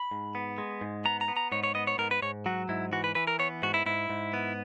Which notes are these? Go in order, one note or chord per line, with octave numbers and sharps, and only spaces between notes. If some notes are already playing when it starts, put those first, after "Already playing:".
Already playing: B5
G#2
B3
G#3
G#2
B3 A#5
A#5
B3
A#5
G#2 C#5
C#5
B3 D#5
C#5
G#2 A#4
B4
G#2 C#5
F#3 F#4
G#2 E4
E3 F#4
B4
E3 B4
A#4
B3 C#5
G#2 F#4
E4
G#2 E4
G#2
B3